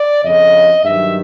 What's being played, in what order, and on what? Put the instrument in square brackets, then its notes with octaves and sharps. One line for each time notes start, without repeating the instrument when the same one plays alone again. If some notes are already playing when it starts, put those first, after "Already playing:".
Already playing: [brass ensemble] D5
F2 C#3 F3 D#5
G2 D#3 F#3 E5